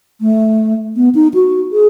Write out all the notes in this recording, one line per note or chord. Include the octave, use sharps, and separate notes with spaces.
A3
B3
D#4
F#4
G#4